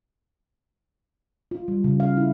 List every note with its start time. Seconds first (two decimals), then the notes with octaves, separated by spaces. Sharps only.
1.51 F4
1.68 G3
1.84 C#3
2.00 F5
2.17 E4